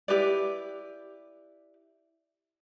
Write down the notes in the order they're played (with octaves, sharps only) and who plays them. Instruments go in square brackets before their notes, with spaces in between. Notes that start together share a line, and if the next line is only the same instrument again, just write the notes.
[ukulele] E4 G4 B4 D5